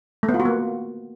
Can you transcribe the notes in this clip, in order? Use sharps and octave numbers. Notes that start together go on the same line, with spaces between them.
A3
B3
F4
F#4
A#3